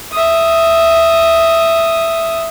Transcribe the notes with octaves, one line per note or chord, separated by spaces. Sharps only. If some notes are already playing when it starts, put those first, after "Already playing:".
E5 D#6